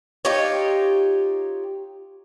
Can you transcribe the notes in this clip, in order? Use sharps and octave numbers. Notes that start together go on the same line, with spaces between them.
D#4 F4 G4 C#5